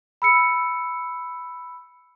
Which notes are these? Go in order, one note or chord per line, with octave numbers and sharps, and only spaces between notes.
B5 E6 C#7